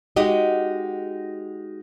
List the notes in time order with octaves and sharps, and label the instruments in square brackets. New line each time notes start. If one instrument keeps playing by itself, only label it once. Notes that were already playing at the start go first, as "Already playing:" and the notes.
[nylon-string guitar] G#3 D#4 F#4 G4 D#5